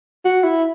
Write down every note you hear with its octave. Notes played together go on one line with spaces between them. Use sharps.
F#4
E4